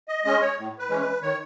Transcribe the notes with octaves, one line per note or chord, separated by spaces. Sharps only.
D#5
G#3 C#4 D#5
C#5
A2
B4
E3 G#3 C#4
B4
D#3 C#5